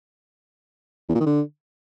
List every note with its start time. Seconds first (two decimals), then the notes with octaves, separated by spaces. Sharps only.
1.09 E2
1.15 A#2
1.21 D#3
1.26 D3